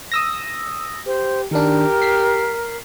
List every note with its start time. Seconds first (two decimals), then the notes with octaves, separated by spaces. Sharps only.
0.12 D#6 E6 A#6
1.06 G4 C5
1.51 D#3 D4 G4 A#4
2.02 B6 C7